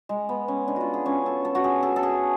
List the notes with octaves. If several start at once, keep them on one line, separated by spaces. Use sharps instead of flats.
G#3
B3
C#4
D4
F4 F#4
G#4
C#4
A4
A4
F#4
G#4
A4
A4
G#4